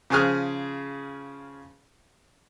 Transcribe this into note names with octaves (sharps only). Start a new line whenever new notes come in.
C#3 F3 G#4 D#6 F6